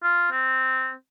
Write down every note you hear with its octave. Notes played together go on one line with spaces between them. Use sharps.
F4
C4